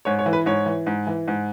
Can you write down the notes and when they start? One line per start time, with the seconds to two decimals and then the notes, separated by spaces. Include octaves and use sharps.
0.05 G#2 C#5
0.19 C#5
0.26 E3
0.33 B4
0.46 G#2 C#5
0.66 E3
0.87 G#2
1.07 E3
1.28 G#2